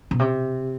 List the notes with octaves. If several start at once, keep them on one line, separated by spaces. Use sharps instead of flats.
B2
C3